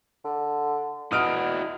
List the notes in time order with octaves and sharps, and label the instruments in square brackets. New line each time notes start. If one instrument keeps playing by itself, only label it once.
[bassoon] D3
[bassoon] B3 [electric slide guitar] E4 F#4 D#5 [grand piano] D#6 F6 D7